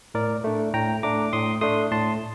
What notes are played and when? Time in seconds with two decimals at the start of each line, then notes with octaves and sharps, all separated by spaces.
0.14 A2 A#4 D5
0.44 A3 D4
0.74 A2 G5 A#5
1.03 A3 D4 A#5 D6
1.33 A2 C6 D#6
1.61 A3 D4 C6 D#6
1.91 A2 A5 C6